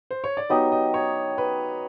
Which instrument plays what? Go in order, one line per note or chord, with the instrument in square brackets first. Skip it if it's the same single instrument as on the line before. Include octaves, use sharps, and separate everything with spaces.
[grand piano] C5
C#5
D5
[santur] F#3 B3 D#4 G4 [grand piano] D#5
[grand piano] D#5
C#5
B4